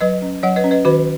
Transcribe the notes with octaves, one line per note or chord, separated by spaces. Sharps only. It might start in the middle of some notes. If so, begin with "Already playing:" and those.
F#3 B4 D#5
C#4
F#3 C#5 F#5
B4 D#5
C#4
B4 D#5
D#3 F#4 B4